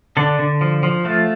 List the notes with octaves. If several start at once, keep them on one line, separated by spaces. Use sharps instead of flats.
D3 D4
D3
F3
F3
A3 F4